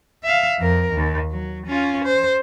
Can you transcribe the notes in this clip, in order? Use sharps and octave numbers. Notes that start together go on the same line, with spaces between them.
E5 F5
F2 A#4
D#2
F#3
C#4 F4
C5